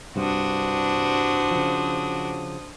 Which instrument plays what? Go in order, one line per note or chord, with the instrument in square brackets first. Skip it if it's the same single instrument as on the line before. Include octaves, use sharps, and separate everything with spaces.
[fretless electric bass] C2 G2 [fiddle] D4 F#4 [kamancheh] C5 D#6
[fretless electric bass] C#3 F3